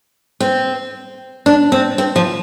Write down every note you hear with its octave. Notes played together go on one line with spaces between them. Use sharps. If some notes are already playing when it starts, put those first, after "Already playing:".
C4
D4
C4
C4
F3